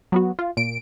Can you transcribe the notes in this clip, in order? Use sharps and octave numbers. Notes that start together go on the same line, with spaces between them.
F#3 B3 F#4
F4
A#2 D7